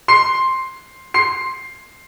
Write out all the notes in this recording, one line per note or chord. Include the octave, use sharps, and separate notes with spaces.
C6 C7
C6 C7